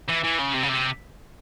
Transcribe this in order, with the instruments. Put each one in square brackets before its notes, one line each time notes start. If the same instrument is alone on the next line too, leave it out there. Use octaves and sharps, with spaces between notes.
[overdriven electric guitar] E3
E3
C#3
C3
C#3
C3